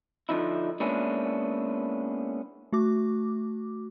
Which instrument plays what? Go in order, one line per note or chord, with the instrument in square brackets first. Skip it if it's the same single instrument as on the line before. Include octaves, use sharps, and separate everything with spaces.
[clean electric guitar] D3 F3 D#4 E4
G#3 A#3 B3 C#4 D4 E4
[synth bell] A3 F#4 D6